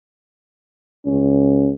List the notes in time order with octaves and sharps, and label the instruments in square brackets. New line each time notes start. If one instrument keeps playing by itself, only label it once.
[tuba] C#2 [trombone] C#4